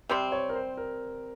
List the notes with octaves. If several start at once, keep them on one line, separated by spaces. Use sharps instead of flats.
C3 G3 C4 C5
C#5
A#4
C5
A#4